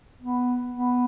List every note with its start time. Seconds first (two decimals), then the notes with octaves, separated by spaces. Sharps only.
0.21 B3
0.74 B3